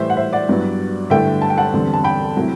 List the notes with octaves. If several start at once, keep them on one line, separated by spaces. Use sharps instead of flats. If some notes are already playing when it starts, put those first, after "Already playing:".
Already playing: A2 E3 G3 C5 E5
F#5
C5 E5
D5 F#5
G2 F#3 B3 E4
G2 D3 A3 E4 E5 G5
A5
G5
F#5 A5
E2 D3 G3 C4
A5
G5 B5
C3 F#3 A3 E4